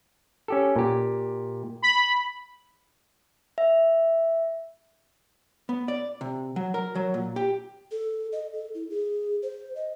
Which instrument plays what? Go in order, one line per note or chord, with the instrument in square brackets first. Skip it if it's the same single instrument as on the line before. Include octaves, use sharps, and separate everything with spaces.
[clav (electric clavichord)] C#4 G4 A4
A#2 G4
[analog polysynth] B5
[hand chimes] E5
[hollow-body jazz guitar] B3
D5
C3
F#3
A#4
F#3
A#2
G4
[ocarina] A4
D#5
A4
E4
G#4
C5
D#5